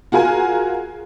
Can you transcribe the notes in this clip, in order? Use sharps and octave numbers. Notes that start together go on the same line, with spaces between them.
F4 F#4 G#4 A#4 G#5